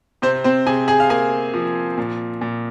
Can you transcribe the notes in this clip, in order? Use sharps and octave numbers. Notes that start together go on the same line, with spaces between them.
C3 C4 C5
C4 C5
C3 G#4 G#5
G#4 G#5
F5
A#3 G#4 G#5
F3
A#2
A#2